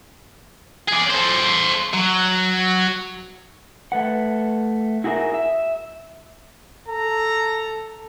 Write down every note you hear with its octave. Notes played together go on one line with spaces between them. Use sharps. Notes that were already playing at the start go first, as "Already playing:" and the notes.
G#4 D5
A4 C5
F#3
A3 B4 F#5
E4 F#4 G#4 A#4 E5
E5
A4 A#5